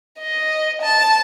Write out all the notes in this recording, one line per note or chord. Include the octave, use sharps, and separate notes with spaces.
D#5
A5